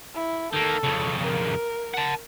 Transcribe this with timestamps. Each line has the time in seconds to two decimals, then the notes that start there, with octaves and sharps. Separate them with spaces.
0.14 E4
0.53 D#3 A#3 A4
0.84 F2 C#3
1.22 A#4
1.94 F#5 A5